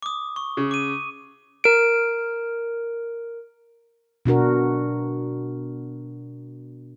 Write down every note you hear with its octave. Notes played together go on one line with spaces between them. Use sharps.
D6 D#6
C#6
C#3
D6 D#7
A#4 D7
B2 D4 F#4 A#4